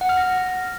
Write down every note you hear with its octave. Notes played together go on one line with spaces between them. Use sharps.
F#5
F6
A#6